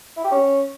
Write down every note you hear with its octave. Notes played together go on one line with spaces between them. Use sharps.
E4
G4
C#4